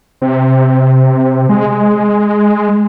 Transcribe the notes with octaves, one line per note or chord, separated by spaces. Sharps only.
C3
G#3